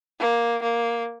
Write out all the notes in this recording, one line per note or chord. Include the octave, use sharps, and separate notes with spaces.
A#3
A#3